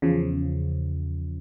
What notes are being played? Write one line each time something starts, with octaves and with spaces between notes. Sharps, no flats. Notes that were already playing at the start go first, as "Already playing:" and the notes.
E2 C#3 F3